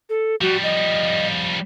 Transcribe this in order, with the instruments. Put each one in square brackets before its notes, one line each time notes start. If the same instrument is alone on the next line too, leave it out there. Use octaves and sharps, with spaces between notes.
[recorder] A4
[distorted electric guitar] F3 G3 [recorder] F#4
[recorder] D#5